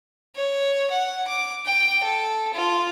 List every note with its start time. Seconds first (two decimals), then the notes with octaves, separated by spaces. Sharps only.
0.36 C#5
0.90 F#5
1.27 D6
1.65 G5
2.03 A4
2.53 F4